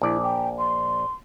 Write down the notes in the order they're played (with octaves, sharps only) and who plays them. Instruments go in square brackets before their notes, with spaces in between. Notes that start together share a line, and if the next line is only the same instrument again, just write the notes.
[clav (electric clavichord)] A#1 D5 [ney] E4
[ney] G5
C6